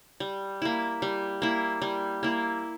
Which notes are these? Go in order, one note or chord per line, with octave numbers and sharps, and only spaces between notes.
G3
A#3 E4
G3
A#3 E4
G3
A#3 E4